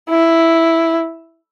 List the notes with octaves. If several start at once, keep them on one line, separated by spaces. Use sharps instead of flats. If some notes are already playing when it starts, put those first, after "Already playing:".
E4